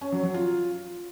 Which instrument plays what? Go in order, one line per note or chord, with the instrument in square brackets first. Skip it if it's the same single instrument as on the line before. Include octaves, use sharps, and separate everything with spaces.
[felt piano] C#4
F#3
F#3
F4